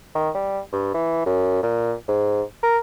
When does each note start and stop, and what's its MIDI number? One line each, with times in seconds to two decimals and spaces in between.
0.15 0.30 51
0.34 0.59 55
0.72 0.90 43
0.94 1.22 52
1.26 1.61 42
1.63 1.94 46
2.08 2.42 44
2.63 2.77 70